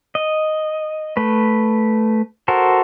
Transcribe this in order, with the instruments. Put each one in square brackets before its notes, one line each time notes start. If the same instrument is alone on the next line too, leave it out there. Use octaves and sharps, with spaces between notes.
[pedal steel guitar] D#5
A3 B4
F#4 A4 A#4 C5